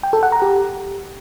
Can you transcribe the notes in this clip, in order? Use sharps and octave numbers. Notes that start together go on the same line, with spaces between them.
G5
A4
F#5
A#5
G4